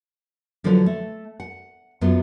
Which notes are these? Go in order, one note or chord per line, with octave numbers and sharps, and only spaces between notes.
D3 F3 F#3 C#4 F4 B4
A3
F#5
F#2 F#3 B3 F4